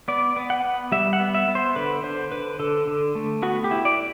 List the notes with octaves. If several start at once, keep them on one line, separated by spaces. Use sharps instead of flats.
B3 D5
B3
F#5
B3
G3 E5
F#5
B3
E5
B3
C5
D3 B4
D3 C5
D3 B4
D3 A4
D3
A3
B3 F#4
G4
E4
D5